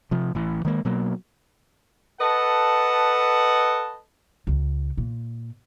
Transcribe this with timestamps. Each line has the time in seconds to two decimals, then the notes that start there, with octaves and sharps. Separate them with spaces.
0.11 C3 F3
0.35 A1 E3
0.65 D#3 G#3 A#3
0.85 B2 F#3 A#3
2.20 A4 B4 D#5 F#5 A5
4.47 C#2
4.97 A#2